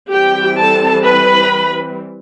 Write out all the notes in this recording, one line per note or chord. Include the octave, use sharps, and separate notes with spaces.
E3 G3 C4 G4 G5
A4 A5
B4 B5